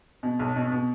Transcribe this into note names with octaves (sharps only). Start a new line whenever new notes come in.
B2
B1
B2
B2